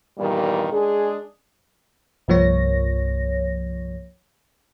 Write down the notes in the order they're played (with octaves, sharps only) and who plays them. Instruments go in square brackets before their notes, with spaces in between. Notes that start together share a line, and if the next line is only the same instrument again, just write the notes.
[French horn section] E2 G2 A#2 D#3 G3
G#3 D4 G#4
[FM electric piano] C2 G2 F3 A#3 C#5 A#6